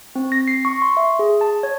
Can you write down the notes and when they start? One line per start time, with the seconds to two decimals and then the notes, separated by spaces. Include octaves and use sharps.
0.15 C4
0.32 A#6
0.48 C7
0.65 C#6
0.82 C6
0.97 E5
1.19 G#4
1.41 A5
1.63 C#5